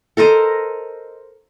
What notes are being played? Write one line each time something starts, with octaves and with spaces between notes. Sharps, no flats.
A4 A#4 C5 D#5